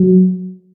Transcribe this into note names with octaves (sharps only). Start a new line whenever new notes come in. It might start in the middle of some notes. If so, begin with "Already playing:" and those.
Already playing: F#3